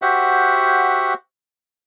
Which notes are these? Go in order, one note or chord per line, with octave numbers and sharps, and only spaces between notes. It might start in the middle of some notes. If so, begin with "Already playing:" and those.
F#4 G4 C5 E5 F#5